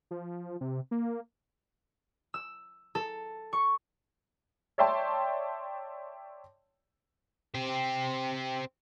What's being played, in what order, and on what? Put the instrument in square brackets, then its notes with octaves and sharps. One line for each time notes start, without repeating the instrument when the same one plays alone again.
[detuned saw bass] F3
C3
A#3
[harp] E6
A4
C#6
[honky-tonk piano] C#5 D5 E5 G5 A5 C6
[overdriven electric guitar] C4 G4